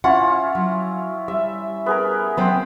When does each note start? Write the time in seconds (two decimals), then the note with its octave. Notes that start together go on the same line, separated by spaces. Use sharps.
0.04 C#4 E4 F4 F#5
0.55 F#3
1.28 G3 E5
1.86 B3 G#4 A#4
2.37 F#3 B3 C4 C5 G5 B5